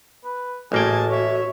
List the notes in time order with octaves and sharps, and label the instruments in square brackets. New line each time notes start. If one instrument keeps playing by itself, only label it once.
[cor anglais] B4
[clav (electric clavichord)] A1 A#3 G5 [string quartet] A2 A5 G#6 [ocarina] F#4 [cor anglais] G#4
[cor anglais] C#5 [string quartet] E5